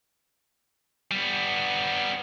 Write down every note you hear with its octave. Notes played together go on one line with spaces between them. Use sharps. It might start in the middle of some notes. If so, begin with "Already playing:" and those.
G3 B3